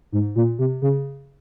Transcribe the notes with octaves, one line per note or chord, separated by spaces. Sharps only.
G#2
A#2
C3
C#3